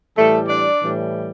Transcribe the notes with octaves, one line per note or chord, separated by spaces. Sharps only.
A2 E3 G3 A3 A4
D4 D5
A2 E3 G3